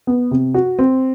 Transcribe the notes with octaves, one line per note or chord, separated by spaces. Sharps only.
B3
C3
F#4
C4